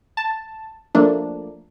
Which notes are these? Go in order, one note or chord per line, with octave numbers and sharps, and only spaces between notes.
A5
F3 A3 A#3 D4